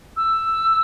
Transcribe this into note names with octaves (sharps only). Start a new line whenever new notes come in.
E6